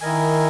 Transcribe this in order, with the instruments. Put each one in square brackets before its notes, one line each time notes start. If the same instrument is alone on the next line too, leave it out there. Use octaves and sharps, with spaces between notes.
[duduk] D#3 [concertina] E4 A#4 D#5 G#5